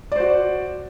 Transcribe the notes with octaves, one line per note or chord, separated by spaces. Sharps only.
F#4 C5 D5